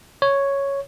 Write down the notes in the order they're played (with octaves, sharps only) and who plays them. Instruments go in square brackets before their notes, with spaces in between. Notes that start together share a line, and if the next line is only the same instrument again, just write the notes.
[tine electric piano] C#5